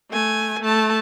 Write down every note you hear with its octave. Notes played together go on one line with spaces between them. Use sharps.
A3 G#5
A3 A5